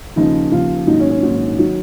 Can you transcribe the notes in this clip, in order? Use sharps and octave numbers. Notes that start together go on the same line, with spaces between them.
D#2 C#3 F3 D#4
D#2 C#3 F3 F4
A#1 G#2 D#3 F#3 D#4
C#4
C#4
A#1 G#2 D#3 F#3
D#3 F#3